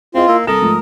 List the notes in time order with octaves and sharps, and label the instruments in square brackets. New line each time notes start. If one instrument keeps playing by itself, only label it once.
[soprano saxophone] C4 [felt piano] E4 D#5 [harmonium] F4 [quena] G#4
[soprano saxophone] A#3 [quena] E6
[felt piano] C2 A#6 E7 [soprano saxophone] A4 [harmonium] A#4 [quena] D#6
[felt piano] G#2 F3 A3